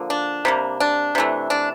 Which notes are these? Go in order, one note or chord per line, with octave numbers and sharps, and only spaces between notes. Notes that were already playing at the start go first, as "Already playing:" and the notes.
Already playing: D3 F3 A#3
D4
C3 G3 A#3
D4
C3 E3 A3
D4